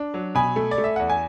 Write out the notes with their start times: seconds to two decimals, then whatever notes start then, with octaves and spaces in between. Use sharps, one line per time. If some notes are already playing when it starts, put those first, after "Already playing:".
Already playing: D4
0.14 F#3
0.35 B2 G#5 B5
0.56 A3
0.71 D5
0.78 A3
0.84 E5
0.96 E2 F#5
1.09 G#5